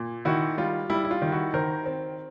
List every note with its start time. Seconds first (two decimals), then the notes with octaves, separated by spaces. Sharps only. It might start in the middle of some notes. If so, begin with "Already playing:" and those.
Already playing: A#2
0.25 D#3 E4 F#4
0.58 G3 F4
0.90 G3 E4
1.05 E4
1.11 F4
1.22 D#3
1.32 E4 F#4
1.54 D#3 A#4 C5
1.86 C4